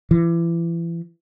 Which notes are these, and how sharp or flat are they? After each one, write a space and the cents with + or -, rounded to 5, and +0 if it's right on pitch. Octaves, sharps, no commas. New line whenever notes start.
E3 +30